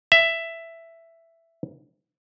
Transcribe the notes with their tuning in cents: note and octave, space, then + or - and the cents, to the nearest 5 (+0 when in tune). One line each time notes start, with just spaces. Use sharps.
E5 +10